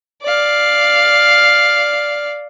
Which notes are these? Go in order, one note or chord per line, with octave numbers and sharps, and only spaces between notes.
D5 F5